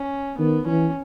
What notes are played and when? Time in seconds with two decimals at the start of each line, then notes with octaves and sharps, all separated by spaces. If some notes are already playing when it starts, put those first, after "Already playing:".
Already playing: C#4
0.38 D#3 B3
0.66 E3 C#4